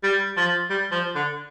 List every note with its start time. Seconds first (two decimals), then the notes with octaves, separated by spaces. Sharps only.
0.03 G3
0.37 F3
0.70 G3
0.92 F3
1.15 D3